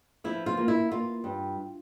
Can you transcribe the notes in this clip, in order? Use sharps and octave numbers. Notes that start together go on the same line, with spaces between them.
F3 E4
F4
A#3
E4
A#3 F4
G2